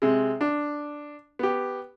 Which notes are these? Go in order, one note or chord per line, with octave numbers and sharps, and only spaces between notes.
C3 G#3
D4
B3 G4